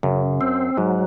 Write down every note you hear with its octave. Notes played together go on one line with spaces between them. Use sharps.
F#2 C#3
C4
G#2 F#3